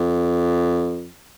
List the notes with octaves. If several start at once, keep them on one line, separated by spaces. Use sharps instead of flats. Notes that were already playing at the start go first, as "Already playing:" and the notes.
Already playing: F2